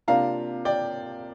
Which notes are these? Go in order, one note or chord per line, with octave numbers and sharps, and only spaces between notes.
C3 A#3 D4 F4 F5 A#5
D5 G5